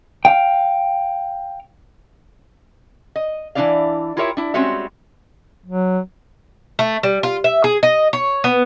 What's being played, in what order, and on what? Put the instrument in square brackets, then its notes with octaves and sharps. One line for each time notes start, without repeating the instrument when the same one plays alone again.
[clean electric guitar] F5 G5
[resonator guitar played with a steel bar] D#5
E3 A3 D4 E4 D5 F5
E4 F4 G4 A#4 C#5 E5
D4 E4
G3 G#3 C4 C#4 F#4 E5
[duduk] F#3
[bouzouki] A3
G3
F4
E5
G#4
D#5
C#5
B3